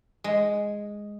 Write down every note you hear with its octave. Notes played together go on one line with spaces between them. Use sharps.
G#3